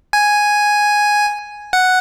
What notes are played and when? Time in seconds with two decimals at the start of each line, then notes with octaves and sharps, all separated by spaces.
0.13 G#5
1.73 F#5